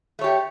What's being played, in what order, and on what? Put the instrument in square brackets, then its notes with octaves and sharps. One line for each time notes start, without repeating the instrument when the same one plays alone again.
[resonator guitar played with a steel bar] A3
C#5
G4